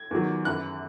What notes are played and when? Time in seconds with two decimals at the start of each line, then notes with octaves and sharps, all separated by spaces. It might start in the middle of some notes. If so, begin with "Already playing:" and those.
Already playing: G#6
0.11 E2 D#3 F#3
0.45 F#2 E3 F#6